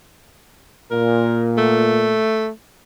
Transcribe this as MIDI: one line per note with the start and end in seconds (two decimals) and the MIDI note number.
0.91 2.20 46
0.91 1.45 70
1.58 2.49 57